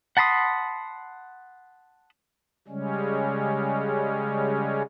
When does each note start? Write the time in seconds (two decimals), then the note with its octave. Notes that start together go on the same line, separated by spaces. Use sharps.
0.17 F#5 A5 B5 C6 D#6
2.68 C#3 G3 G#3 C#4